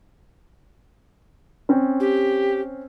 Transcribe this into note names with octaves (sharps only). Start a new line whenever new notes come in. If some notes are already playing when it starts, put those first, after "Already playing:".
C4 C#4
G4